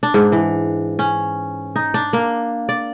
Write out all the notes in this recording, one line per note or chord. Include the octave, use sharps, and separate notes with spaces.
D4
G#2
E3
C#4
D#4
D4
A#3
D5